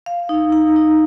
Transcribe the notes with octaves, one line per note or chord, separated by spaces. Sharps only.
F5
D#4
D#4
D#4